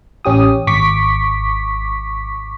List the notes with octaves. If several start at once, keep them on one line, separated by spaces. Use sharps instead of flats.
A1 C#4 G4 D#6
G#1 C#6 D6 B6